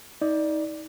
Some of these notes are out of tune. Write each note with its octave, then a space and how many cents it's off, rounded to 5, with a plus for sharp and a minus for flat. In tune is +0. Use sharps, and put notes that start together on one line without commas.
D#4 +30 D5 +0